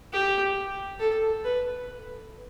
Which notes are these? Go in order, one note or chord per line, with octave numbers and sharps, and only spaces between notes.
G4
A4
B4